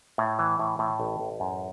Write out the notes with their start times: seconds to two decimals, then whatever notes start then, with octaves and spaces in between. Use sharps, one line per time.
0.18 A2
0.39 E3
0.59 A2
0.79 A2
1.00 A1
1.20 A1
1.40 F#2